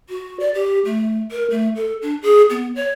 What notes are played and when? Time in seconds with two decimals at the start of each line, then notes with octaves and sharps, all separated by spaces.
0.09 F#4
0.40 D5
0.55 G4
0.85 A3
1.31 A#4
1.50 A3
1.76 A4
2.02 D4
2.22 G#4
2.50 B3
2.76 C#5